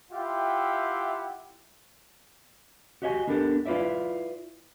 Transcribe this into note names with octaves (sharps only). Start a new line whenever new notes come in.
E4 F4 G4 E5 F#5 G5
F#4 G4 D#5 E5 G#5
B3 D4 G4 A4 A#4
E4 F4 B4 D5 E5